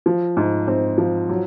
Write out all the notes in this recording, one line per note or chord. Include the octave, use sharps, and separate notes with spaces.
F3
G#2
G#2 C4
F3
F#3